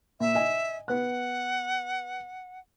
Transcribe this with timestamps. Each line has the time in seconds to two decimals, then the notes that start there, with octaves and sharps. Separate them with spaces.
0.20 A#2 E5
0.35 D#5 G#5
0.88 B3 F#5 F#6